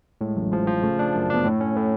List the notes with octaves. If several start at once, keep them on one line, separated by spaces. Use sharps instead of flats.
A2 G#3
A1 F#3
F3 G#3
F3
C#3 A3
D4
F#2
B3 D4
A2 A3
C#4
A2